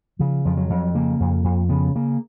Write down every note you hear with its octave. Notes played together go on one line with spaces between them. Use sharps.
C#3 F3
F2 F3
F#3
F2
C#3 A#3
F2
F2
C#3 B3
C#3 A#3